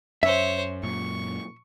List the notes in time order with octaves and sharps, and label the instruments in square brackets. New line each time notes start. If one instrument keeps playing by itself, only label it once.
[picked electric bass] F#2 [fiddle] C5 C#5 [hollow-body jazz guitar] E5
[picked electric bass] F#2 A#2 [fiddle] C#6